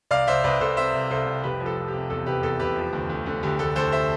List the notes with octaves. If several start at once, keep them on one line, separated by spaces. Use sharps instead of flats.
C2 D5 F5
C2 C5 E5
C2 B4 D5
C2 A4 C5
C3 C5 E5
C2
C2 A4 C5
C2
F1 G4 B4
F3
A4
F3
G4
C3
E2 A4
F1 G4 B4
E2 A4
F1 G4 B4
F3
D2
D2
D3
D2 G4
D2 A4
D2 A4 C5
C5 E5